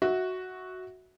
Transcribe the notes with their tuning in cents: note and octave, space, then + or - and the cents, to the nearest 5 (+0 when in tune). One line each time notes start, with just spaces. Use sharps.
F#4 +0 E5 -20